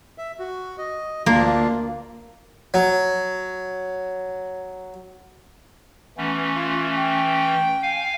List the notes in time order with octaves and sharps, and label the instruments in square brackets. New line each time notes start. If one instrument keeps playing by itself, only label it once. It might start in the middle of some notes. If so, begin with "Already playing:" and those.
[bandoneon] E5
F#4
D#5
[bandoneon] D2 D4 F4 [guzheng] A#3
[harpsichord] F#3 [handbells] C#5
[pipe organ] E3 A3 C#4 [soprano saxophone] B3
[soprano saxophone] F4
G5
[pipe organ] F5 G#5